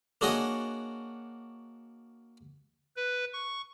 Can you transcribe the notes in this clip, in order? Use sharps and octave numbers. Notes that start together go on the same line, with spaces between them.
A#3 D4 F#4 G#4 C#5 D#5
B4
C#6